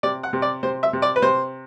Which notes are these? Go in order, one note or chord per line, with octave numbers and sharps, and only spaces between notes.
C3 D5
F#5
C3
D5
C3 C5
E5
C3
D5
B4
C3 C5